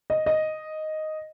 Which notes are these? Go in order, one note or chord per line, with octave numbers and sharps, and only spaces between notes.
D#5
D#5